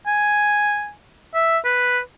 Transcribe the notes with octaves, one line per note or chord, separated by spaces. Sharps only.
G#5
E5
B4